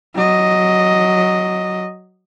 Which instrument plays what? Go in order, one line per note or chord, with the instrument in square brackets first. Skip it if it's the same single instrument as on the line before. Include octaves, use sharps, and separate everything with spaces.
[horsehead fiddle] F#3 D#5